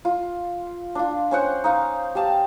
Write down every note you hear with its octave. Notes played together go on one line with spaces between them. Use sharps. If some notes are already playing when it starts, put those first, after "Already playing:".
F4
D4 F4
C#4 C5 F#5
D#4 F5
G4 F5 A5